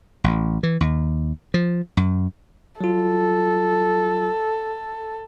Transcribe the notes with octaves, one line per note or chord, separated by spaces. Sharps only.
A1
E3
D#2
F3
F#2
F#3 F4 A4